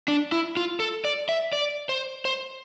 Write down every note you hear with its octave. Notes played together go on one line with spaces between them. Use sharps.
D4
E4
F4
A4
D5
E5
D5
C5
C5